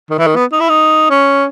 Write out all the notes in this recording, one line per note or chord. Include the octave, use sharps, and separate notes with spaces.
D#3
E3
D#3
B3
D#4
E4
D#4
C#4